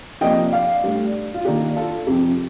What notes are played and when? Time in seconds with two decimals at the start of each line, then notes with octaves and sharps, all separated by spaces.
0.21 C3 F3 A#3 D4 D#5 G5
0.53 D5 F5
0.83 A2 G3 D4
1.34 F4
1.45 D#3 A#3 D4 G4
1.75 F4 A4
2.07 F2 C3 F3 G4